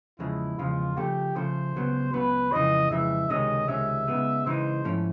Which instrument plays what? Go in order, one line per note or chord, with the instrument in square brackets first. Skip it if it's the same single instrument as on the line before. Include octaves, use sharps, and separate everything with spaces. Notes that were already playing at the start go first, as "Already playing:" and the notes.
[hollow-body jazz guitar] E2 C#3 F3 G#3 [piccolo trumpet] E4
[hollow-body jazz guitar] E2 C#3 F3 G#3 [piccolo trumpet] F4
[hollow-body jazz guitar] C#3 F3 A3 [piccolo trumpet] G4
[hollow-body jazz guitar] C#3 F3 A3 [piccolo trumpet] C5
[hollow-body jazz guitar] C#2 C#3 F#3 B3
[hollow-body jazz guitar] C#2 C#3 F#3 B3 [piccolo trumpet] B4
[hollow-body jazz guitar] F2 C#3 E3 G#3 [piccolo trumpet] D#5
[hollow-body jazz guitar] F2 C#3 E3 G#3 [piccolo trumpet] E5
[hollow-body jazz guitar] C#2 C3 D#3 G#3 C#4 [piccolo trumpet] D#5
[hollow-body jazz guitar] C#2 C3 D#3 G#3 C#4 [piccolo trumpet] E5
[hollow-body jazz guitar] C#3 E3 G#3 B3 D#4
[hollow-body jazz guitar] C#3 E3 G#3 B3 D#4 [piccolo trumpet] C5
[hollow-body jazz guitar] G#2 F3 A3 C#4 E4